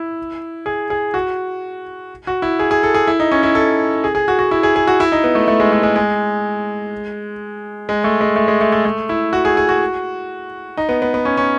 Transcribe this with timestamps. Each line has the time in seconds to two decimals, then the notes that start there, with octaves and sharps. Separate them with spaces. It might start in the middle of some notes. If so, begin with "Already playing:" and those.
Already playing: E4
0.66 G#4
0.90 G#4
1.14 F#4
2.27 F#4
2.42 E4
2.59 G#4
2.71 G#4
2.83 A4
2.94 G#4
3.07 E4
3.20 D#4
3.32 C#4
3.43 E4
3.55 A4
4.04 G#4
4.15 G#4
4.28 F#4
4.39 F#4
4.51 E4
4.63 G#4
4.76 G#4
4.87 F#4
5.00 E4
5.12 D#4
5.24 B3
5.35 A3
5.48 A3
5.60 G#3
5.72 A3
5.83 G#3
5.96 G#3
7.89 G#3
8.04 A3
8.21 G#3
8.36 A3
8.48 G#3
8.61 A3
8.72 A3
8.85 A3
9.09 E4
9.33 F#4
9.45 G#4
9.57 G#4
9.69 F#4
10.77 D#4
10.89 B3
11.02 B3
11.14 B3
11.25 C#4
11.37 C#4